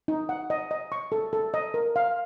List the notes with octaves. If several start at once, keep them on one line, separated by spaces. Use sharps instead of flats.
D#4
F#5
D#5
D#5
C#6
A4
A4
D#5
A#4
F5